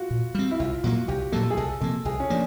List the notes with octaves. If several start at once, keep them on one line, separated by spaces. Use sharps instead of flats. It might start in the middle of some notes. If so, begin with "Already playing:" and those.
Already playing: F4 F#4
A#2
G3 C4
E4
C2 F4
A#2 F#3 A#3 F#4
C2 G4
A#2 F#3 A#3 A4
G#4
C2 A4
C3 F3 A#3 A4
C2 G#4
C#4
F3 A#3 D4